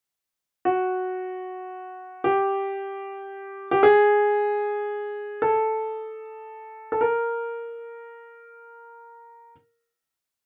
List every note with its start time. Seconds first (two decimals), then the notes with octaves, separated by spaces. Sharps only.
0.65 F#4
2.24 G4
3.71 G4
3.83 G#4
5.42 A4
6.92 A4
7.01 A#4